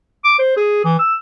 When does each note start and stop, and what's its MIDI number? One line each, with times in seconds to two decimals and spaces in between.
0.24 0.35 86
0.39 0.55 72
0.57 0.80 68
0.85 0.95 52
0.99 1.14 88